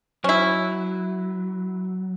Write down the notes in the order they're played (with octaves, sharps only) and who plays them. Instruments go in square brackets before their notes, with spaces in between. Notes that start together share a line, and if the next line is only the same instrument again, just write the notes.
[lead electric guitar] F#3 [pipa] C#4 E4